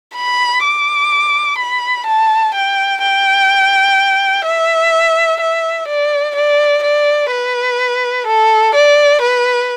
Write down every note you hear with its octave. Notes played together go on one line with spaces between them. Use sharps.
B5
D6
B5
A5
G5
G5
E5
E5
D5
D5
D5
B4
A4
D5
B4